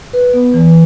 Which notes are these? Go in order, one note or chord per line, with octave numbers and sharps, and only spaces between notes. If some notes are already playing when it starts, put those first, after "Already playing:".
B4
B3
E3